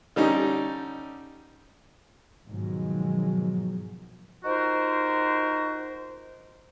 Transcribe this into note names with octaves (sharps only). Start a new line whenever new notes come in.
D3 G3 C#4 D#4
G#2 B2 D#3 F3 F#3 G#3
D#4 F4 F#4 A#4 C5